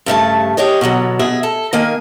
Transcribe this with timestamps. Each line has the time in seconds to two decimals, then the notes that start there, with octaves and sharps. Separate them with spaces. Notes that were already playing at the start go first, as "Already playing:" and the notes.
0.06 G2 C#3 A3 A5
0.57 G4 G#4 C#5 D#5
0.81 B2 D3 E3 F#3
1.19 B2 G#4 E5
1.43 A4
1.73 D#3 A#3 G#5